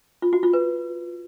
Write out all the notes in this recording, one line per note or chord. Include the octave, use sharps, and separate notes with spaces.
F4
F#4
F4
B4